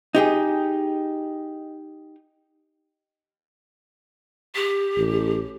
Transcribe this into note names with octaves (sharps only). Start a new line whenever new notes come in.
D#4 G4 G#4
G4
A1